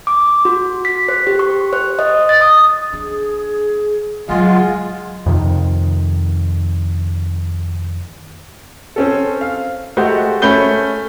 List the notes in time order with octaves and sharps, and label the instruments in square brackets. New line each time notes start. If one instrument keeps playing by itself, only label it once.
[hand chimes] D6
F#4
B6
C5
G4
C#6
C5
D#5
A6
D#6
[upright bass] D4 [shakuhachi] G#4
[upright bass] E3 F#3 [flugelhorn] G#3 [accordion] F4 [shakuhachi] F#5
[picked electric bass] F2 C3 D#3
[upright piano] C4 C#4 A4
F5
G#3 A3 F#4 G4 C5 D#5
A3 C#4 B5 G6 G7